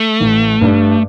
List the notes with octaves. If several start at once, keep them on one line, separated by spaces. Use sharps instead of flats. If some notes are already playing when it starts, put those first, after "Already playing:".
Already playing: A3
A1
G2 G3 D4